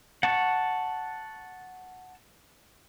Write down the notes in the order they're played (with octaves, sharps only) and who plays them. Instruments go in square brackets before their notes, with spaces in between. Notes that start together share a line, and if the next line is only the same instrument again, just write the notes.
[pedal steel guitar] F#5 A5 C#6